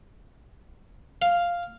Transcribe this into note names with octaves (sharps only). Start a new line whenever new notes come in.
F5